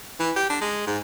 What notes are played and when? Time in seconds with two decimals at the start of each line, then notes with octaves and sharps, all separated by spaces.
0.20 E3
0.36 G4
0.50 D4
0.61 G#3
0.87 G#2